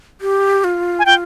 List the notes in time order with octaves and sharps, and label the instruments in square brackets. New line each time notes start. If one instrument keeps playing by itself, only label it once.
[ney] G4
F4
[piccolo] G#5
[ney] F4 [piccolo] G5